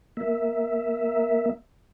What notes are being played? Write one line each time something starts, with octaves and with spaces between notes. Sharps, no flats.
A#3 E5